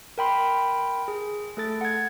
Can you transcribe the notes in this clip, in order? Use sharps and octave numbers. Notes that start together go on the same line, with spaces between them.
A#4 G5 B5 C6
G#4
A3 A4 A6
F#5 G#6